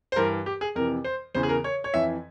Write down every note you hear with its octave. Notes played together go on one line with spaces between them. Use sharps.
C5
G2 E3 A#4
G4
G#4
F2 C3 E3 A#4
C5
E2 C#3 E3 C5
G#4
A#4
C#5
C#5
F2 E3 E5